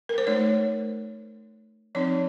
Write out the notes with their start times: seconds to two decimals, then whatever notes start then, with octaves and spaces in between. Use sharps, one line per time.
0.09 A#4
0.18 C5
0.27 A3 D#4 C#5
1.95 F3 C4 D#4 C#5